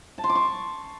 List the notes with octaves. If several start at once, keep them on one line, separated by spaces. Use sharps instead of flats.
A5
C6
D6
C#6